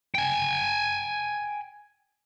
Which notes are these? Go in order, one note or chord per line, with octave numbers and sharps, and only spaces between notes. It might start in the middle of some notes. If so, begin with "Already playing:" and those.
G5 G#5